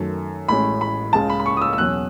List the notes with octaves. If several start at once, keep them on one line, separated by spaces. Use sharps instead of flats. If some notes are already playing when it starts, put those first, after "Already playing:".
Already playing: F#2 D#3 A3
A1 A2 G#3 C#4 B5
B5
C#2 C#3 G#3 A5
B5
B5
C#6
D#6
E6
E6
E2 B2 F#3 C#4 F#6